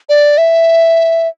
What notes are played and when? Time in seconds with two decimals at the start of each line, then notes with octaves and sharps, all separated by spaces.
0.09 D5
0.38 E5